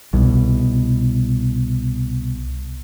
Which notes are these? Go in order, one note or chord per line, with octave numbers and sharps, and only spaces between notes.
C2 B2